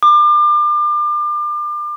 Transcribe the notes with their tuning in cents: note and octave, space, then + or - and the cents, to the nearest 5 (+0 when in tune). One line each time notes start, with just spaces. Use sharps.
D6 +35